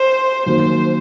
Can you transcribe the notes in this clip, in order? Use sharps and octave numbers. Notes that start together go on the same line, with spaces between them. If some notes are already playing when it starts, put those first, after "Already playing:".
Already playing: C5
F#2 D#3 F#3 A#3 C5